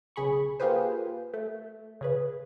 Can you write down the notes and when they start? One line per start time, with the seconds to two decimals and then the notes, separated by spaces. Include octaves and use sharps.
0.16 B1 C#3 G#4 B5 C#6
0.60 A#3 F4 G4 G#4 B4 C5
1.33 A3
2.01 C#3 G#4 B4